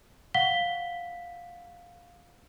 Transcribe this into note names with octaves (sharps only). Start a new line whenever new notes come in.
F5 F#5 B6 G7